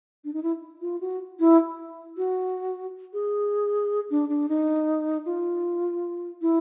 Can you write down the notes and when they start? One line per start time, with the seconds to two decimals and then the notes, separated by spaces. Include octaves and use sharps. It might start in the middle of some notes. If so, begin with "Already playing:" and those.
0.24 D4
0.33 D#4
0.43 E4
0.81 F4
1.01 F#4
1.40 E4
2.17 F#4
3.13 G#4
4.10 D4
4.29 D4
4.49 D#4
5.26 F4
6.42 E4